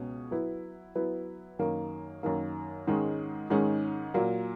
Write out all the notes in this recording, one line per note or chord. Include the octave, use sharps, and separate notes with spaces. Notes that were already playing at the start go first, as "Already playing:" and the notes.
Already playing: C#2 B2 C#4
F#3 B3 E4 B4
F#3 B3 E4 B4
F#2 D#3 A#3
F#2 D#3 A#3
G#2 D#3 G#3 C#4
G#2 D#3 G#3 C#4
A#2 F#3 A#3